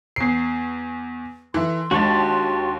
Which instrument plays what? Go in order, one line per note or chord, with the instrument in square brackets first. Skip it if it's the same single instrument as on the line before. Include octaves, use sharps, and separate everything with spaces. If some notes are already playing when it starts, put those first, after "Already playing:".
[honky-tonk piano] E2 C7
[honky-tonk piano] E3 [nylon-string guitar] A4 E5 A5 [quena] C6
[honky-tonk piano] D#2 [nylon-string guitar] G#3 D4 [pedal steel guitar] F#4 G4 A5